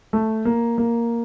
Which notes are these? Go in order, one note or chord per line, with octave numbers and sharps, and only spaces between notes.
A3
A#3
A#3